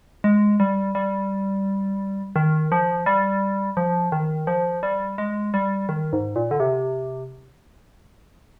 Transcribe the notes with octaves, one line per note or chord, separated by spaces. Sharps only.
G#3
G3
G3
D#3
F3
G3
F3
D#3
F3
G3
G#3
G3
D#3
G#2
A#2
D3
C3